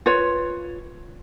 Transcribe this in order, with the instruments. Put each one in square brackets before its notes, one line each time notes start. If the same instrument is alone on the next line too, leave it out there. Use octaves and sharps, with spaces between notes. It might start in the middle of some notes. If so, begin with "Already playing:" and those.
[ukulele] F4 B4 C#5